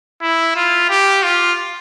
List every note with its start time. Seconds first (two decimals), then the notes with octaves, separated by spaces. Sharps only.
0.22 E4
0.56 F4
0.90 G4
1.23 F4